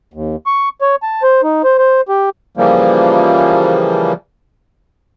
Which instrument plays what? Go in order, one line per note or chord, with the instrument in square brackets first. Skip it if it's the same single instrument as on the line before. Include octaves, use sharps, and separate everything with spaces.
[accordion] D#2
C#6
C#5
A5
C5
D#4
C5
C5
G4
C#3 E3 F3 G3 A#3